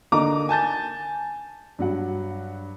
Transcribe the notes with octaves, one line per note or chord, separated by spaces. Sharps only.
D3 A#3 D#4 D#5 A#5 D6
G#5 A5 G6 A6
G2 F#3 F#5